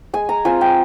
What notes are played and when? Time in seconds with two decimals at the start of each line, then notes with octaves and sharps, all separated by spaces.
0.13 G#3 G#5
0.29 A#5
0.45 C4 F4 G#5
0.61 G5